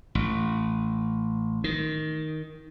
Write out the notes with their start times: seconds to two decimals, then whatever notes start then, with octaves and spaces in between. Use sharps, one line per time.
0.15 A1
1.64 D#3